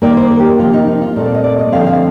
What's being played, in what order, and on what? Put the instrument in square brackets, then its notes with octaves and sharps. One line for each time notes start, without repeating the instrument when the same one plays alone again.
[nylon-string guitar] D#3 A#3 D5
C5
A#4
G4
C3 F3 A#3 F4
D#4
D#4
F4
A#2 A3 C4
D5
D#5
D5
D#5
D3 F3 A3 C4 F5
F5